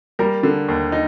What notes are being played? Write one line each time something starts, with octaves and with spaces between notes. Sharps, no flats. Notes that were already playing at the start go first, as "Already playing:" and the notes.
G3 A#3 A#4
D3
D#2
D#4